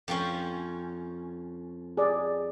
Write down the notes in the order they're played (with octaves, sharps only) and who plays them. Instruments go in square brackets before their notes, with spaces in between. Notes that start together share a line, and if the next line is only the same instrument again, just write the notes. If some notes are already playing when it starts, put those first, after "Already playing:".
[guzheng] F2 F3 C#4
[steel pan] G#4 D5